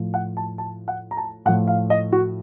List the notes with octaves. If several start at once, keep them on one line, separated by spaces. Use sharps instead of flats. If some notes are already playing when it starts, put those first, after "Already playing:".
Already playing: A2 F3
F#5
A5
A5
F#5
A#5
A5
A2 F3 F#5
F5
D#5
F#4